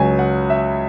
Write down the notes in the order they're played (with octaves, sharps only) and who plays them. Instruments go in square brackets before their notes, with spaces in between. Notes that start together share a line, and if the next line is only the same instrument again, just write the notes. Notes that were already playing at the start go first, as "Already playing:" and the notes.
Already playing: [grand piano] C#2 C#3 F#3 G#5
F#5
E5